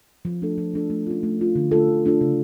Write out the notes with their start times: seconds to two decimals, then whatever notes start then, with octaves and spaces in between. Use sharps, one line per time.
0.25 F3
0.42 A3 D4 A4
0.58 F3
0.74 A3 D4 A4
0.90 A3
1.06 C#4 F4
1.23 A3
1.39 C#4 F4
1.55 D3
1.71 A3 D4 F4 A4
1.88 D3
2.05 A3 D4 F4 A4
2.21 C#3